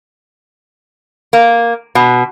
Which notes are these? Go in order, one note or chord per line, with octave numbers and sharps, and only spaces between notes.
A#3
B2